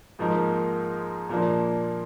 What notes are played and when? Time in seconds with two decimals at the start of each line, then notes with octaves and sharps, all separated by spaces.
0.19 G#2 F3 A#3 D#4 A#4
1.29 A#2 F3 A#3 D4